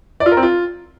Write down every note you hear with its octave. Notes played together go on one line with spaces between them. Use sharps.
D5
F4
A#4
C4
F4